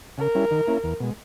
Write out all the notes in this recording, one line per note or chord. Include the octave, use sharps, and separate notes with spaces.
C#3 A#4
G3 C#4 E4
D#3
A#3 C#4 E4
E2
B2 G#3